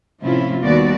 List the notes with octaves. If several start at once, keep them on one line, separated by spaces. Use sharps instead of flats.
A2 C3 F3 C#4 E4 F4
D#2 G3 B3 F#4 D5